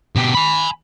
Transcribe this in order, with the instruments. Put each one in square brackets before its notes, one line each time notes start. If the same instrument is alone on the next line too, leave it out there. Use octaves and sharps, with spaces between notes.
[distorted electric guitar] B2 G4
G#5 B5